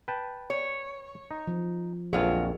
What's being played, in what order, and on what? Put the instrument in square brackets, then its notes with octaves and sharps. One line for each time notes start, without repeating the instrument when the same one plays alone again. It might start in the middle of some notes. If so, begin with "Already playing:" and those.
[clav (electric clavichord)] B4 G5 A5
[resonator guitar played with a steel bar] C#5
[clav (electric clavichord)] D#4
[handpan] F3
[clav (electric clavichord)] A#1 F2 [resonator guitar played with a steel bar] F#3 F4 [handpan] G#4